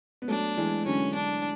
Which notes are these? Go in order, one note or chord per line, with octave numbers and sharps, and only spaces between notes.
B3
F#3 A3 D4
E3 G#3
D3 F#3 C#4
D4